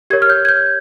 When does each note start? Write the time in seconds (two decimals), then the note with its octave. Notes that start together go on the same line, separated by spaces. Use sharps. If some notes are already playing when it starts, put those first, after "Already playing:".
0.10 G4 A#4 C#5 G#6
0.22 F6
0.30 G6
0.45 G#6
0.49 G6